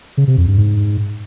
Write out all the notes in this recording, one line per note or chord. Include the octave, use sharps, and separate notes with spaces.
C#3
C3
F2
G2
G#2